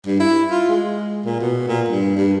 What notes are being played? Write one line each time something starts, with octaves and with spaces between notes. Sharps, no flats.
G2
E4
F4
G#3
A#2
B2
A#2
G2
G2